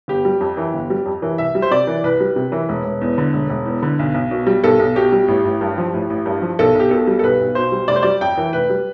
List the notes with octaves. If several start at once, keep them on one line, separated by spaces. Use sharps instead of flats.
G1 G4
G3
F2
E3
G1
G3
F2
E3
C2 E5
G3
C5
C3 D5
E3
C2 B4
G3
C3
E3
E1
E1
E2
D3
E1
E1
E2
D3
B1
B1
B2
G3
B1 A4
B1
B2 G4
G3
A1
A1
G2
F3
A1
A1
G2
F3
B1 A4
B1
G4
B2 A4
G3
A4
B1 B4
B1
B2 C5
G3
F1 D5
C5
G3 D5
F2 G5
E3
F1 B4
G3